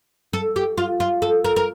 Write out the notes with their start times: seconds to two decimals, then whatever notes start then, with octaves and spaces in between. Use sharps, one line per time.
0.33 A4
0.56 G4
0.78 F4
1.00 F4
1.22 A4
1.44 A#4
1.56 A#4